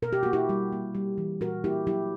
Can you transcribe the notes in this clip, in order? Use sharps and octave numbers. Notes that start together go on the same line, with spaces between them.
B2 A#4
G4
A#3 F#4
E4 G4
G3
A#3
G3
E3
A#2 F#4 A#4
A#3 E4 G4
F#3 E4 G4